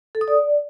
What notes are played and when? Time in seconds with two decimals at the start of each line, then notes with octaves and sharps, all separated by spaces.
0.15 A4
0.21 D#6
0.28 D5